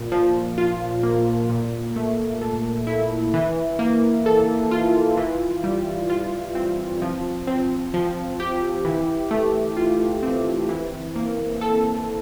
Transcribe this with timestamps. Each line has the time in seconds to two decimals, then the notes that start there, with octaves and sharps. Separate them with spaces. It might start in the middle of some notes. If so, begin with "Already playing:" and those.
Already playing: A#2
0.12 F3
0.58 F4
1.03 A#3
1.49 A#2
1.96 A3
2.41 A4
2.87 E4
3.34 E3
3.79 A#3
4.26 A4
4.71 F4
5.17 E3
5.64 G3
6.10 F4
6.55 C4
7.02 F3
7.47 C4
7.94 F3
8.40 G4
8.85 E3
9.31 A3
9.77 F4
10.23 C4
10.69 E3
11.16 A#3
11.61 A4